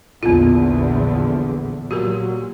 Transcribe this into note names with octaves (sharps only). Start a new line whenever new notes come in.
A#1 E2 D3 B3 F4
A#2 F#3 F#4 G4 A#4